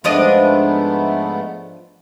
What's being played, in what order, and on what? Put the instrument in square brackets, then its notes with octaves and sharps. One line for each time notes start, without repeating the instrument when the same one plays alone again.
[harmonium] G#2 A3 B3 [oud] F3 D4 D#5